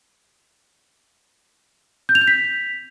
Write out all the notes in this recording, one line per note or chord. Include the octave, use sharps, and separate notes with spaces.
G6
F7
G6
B6